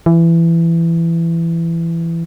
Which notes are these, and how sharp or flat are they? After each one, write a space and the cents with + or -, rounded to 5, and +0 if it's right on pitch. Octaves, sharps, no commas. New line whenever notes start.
E3 +20